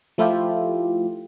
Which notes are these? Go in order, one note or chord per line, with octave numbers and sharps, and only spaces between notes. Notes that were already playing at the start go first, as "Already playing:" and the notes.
F3 A3 E4 F4 G4